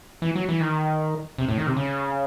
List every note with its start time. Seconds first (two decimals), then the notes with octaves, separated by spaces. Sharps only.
0.22 E3
0.35 F#3
0.49 E3
0.61 D#3
1.38 C3
1.48 A2
1.58 D#3
1.67 C3
1.77 C#3